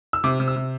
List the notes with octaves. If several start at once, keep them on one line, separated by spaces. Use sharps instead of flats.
E6
C3 D6
C3
E6
C3